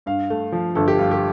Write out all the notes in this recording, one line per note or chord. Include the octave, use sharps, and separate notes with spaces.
G2 F5
A3
F3
G1 A4
G4
G2 F4
G4